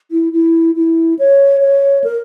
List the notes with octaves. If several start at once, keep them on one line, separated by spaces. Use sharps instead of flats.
E4
E4
E4
C#5
C#5
A#4